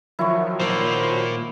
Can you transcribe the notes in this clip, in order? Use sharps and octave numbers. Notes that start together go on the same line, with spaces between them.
D#3 F3 F#3 E4 C#6
A#2 A#3 C5